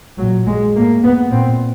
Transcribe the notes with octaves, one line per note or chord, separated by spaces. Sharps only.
A#2 F#3
G#3
A2 A#3
B3
A#2 C4